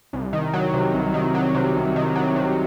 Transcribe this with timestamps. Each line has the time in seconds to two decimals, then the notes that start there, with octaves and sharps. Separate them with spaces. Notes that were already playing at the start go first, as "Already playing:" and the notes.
0.13 C2
0.33 D#3
0.53 F#3
0.74 C3
0.94 C2
1.14 D#3
1.35 F#3
1.55 C3
1.76 C2
1.96 D#3
2.15 F#3
2.36 C3